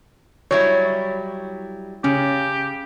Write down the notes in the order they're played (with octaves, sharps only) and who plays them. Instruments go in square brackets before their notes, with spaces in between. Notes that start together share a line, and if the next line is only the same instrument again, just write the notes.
[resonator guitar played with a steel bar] F#3 G3 E4 [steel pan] C#5
[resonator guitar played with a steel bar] C#3 [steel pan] C#4 [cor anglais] G4